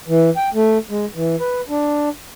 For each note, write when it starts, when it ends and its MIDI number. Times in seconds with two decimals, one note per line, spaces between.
0.08 0.30 52
0.37 0.49 79
0.54 0.78 57
0.90 1.05 56
1.15 1.36 52
1.40 1.61 71
1.69 2.09 62